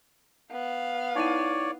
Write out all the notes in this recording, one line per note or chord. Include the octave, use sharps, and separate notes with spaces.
B3 F5
D#4 E4 C#5 D5 D#7